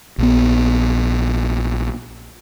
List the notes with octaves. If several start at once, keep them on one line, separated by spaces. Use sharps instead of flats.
A#1 B3